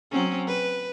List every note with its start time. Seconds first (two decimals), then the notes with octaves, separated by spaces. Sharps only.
0.11 F#3 C4 C#4
0.48 B4